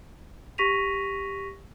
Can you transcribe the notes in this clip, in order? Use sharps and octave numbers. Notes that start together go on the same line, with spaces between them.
G4 C#6 A#6 B6 D#7 F7